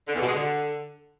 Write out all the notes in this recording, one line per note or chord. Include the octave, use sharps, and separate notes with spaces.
D3
E2
B2
G#3
D3